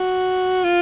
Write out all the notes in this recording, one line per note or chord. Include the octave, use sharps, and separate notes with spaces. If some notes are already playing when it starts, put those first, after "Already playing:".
Already playing: F#4
F4